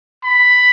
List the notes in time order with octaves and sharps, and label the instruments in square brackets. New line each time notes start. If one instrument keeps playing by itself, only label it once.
[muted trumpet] B5